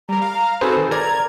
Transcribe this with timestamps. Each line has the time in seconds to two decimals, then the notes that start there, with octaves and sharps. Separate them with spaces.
0.09 G3 A#4 A#5
0.22 F5
0.34 A#5
0.61 C4 D#4 F#4 G#4 A4 B4 C5
0.77 D#3
0.91 A#4 D5 A#5 G#6